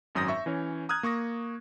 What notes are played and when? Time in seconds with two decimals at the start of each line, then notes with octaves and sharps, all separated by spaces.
0.15 G#1 F#2 D#6 G6 A#6
0.28 E5 C#6
0.46 E3 C#4 C#5
0.89 A#5 D#6 F6 F#6 G#6
1.03 A#3 C#6 D#6 A#6